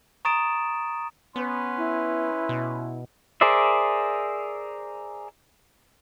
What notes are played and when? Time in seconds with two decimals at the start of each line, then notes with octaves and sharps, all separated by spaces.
0.25 A#5 C#6 D#6 A6 D7 E7
1.36 B3 C#4 B4 C6
1.77 E4
2.49 B2
3.41 G#4 A#4 C5 D5 E5